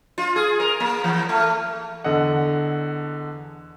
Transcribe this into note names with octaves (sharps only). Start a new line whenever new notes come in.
F4
G#4
A#4
A#3
E3
A3
E2 D3 A4 D#5 F#5